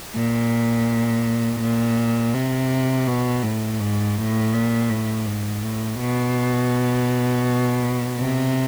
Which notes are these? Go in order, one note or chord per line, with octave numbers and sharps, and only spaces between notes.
A#2
A#2
C3
B2
A2
G#2
A2
A#2
A2
G#2
A2
B2
C3